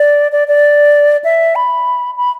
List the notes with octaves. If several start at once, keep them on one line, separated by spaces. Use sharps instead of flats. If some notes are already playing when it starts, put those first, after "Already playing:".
Already playing: D5
D5
D5
E5
B5
B5